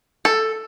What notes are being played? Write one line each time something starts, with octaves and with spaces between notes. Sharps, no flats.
A4